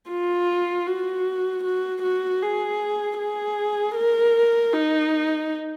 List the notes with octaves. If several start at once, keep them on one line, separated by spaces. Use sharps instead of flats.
F4
F#4
F#4
F#4
G#4
G#4
A#4
D#4